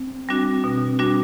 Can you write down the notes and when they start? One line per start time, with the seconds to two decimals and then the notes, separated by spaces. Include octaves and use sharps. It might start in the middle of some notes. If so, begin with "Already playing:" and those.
Already playing: C4
0.29 G3 D4 F#4
0.64 B2
0.99 G3 D4 F#4